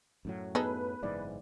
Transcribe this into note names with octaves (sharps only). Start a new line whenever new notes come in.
F#2 A2 F#3
B3 D#4 G#4 A4 B4
F#1 G#2 E3 D5